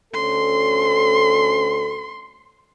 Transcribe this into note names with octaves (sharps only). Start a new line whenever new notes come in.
D2 C#4 A4 C6